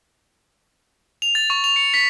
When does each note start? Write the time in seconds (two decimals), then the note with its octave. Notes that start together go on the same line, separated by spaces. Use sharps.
1.22 F7
1.35 A6
1.50 C#6
1.64 F7
1.76 C#7
1.94 B6